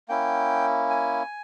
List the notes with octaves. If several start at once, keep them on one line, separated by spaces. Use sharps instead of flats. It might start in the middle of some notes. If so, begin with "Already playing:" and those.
A#3 C#4 E4 G5
G#5